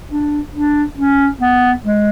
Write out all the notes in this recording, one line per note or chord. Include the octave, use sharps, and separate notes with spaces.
D4
D4
C#4
B3
G#3